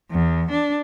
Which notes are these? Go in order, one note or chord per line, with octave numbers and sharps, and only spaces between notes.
E2
D4